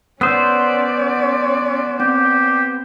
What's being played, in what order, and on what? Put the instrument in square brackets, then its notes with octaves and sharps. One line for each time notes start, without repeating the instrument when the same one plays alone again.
[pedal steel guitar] B3 C5 [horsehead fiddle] C#4 D5 [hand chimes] F#5 D#6 E6
[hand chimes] C4 [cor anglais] G4